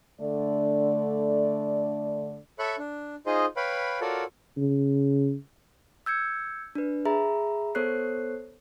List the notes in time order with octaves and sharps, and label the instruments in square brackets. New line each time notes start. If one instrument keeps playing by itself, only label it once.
[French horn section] D3 A3 D5
[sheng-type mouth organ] A4 C#5 E5 B5 C#6 F#6
D4
D#4 F4 G#4 C5 D#5
B4 C#5 F5 G5 B5
F4 F#4 A4 A#4 C#5 D5
[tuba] C#3
[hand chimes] E6 G6 G#6 C#7
D4 B4
G#4 E5 A#5 B5
B3 A4 C5 C#5 F#6 C7